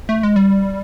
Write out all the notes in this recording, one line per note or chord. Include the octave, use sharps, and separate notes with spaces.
A3
G#3
G3